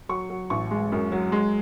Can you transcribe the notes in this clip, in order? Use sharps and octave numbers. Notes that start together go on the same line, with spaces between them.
F#3 C#6
F#3
A1 C#6
G#3
F#2
F#3
G#3